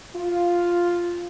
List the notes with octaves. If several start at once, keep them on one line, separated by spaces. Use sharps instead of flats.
F4